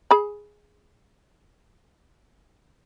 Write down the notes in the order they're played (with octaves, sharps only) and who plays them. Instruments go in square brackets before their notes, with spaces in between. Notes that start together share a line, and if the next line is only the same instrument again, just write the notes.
[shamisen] G#4 B5